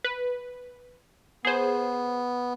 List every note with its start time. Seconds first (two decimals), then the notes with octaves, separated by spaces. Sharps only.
0.04 B4
1.45 B3 G#4 C5